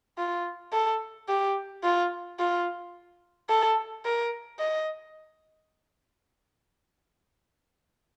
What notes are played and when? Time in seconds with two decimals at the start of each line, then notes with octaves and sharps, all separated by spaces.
0.18 F4
0.73 A4
1.28 G4
1.83 F4
2.39 F4
3.49 A4
4.05 A#4
4.59 D#5